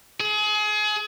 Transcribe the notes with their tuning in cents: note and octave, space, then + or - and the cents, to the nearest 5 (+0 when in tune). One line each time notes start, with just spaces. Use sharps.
G#4 +30